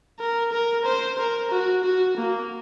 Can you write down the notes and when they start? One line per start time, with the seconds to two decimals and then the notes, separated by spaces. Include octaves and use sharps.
0.19 A#4
0.52 A#4
0.85 C5
1.18 A#4
1.51 F#4
1.84 F#4
2.17 A#3